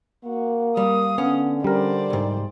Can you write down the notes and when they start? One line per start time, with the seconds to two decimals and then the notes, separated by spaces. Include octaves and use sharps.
0.25 A#3 F#4
0.77 G3 F5 D#6
1.18 D3 B3 C#4
1.64 G3 A#4 C5 D5
2.10 C2 G#2